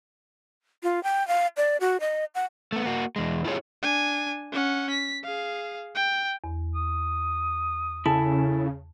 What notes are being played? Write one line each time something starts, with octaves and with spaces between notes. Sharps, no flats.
F4
G5
F5
D5
F#4
D#5
F#5
A3 B3
A#3 F#4
E2 G#3
E4 F4 G4 G#4 C#5
D4 G#5
C#4 F#5
B6
G#4 F5
G5
E2
D#6
C#3 E4 A4 G#5 A5